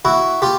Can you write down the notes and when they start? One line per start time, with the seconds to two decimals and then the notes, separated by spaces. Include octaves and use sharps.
0.05 E4 F#4
0.42 F4 G4